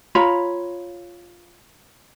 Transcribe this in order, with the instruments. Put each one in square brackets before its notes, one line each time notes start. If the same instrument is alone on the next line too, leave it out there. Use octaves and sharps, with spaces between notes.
[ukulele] F4 C#5 A#5 B5